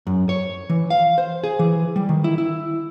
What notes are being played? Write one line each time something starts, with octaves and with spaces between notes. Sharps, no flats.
F#2
C#5
E3
F5
C5
G#4
E3
G3
D#3
E4
E4